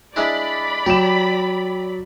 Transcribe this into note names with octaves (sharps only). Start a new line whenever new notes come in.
G#3 D4 E4 D5 B5
F#3 G4 E7